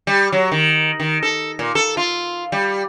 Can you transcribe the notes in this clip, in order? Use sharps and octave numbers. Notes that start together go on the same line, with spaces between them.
G3
F#3
D#3
D#3
A4
A#2
A4
F4
G3